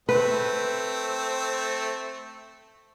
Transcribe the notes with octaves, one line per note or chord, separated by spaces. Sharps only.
A3 C4 B4